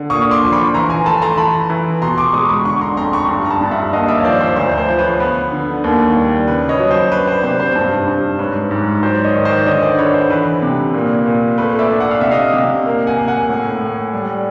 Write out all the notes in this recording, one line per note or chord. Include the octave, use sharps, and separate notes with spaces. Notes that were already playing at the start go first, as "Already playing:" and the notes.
Already playing: D3
A#2 C#6 D#6
C6 D6
F3
B5 C#6
E3 A#5 C6
G#5 A#5
A3 A5 B5
A#5 C6
E3 A5 B5
E3
B2 A#5 C6
C6 D6
G#3 C#6 D#6
B5 C#6
D3 B5 C#6
A#5 C6
F2 A#5 C6
B5 C#6
G2
A#5
A5 B5
G2
E5 F#5
D#2 D#5 F5
D5 E5
C#5
F3 C5 D5
C5
D2 C5
C5
F3
B4 C#5
B3 B4
D3
D#2
G3
C#3 B4
C#5 D#5
F#3
C5
D4 B4
C5
C3 C5
C5
G2
G2
G#2 B4 C#5
G#2
F#3 C5 D5
C#5 D#5
D#3
C5 D5
D3 C#5 D#5
C5 D5
D3 B4 C#5
C5
E3 B4
C3
A#2
A#2
A3 B4
D5 E5
D4
F#5
F5
C3 E5
D#5 F5
C3
A#3
F#5 G#5
A#3
F#5 G#5
A2
A2
G3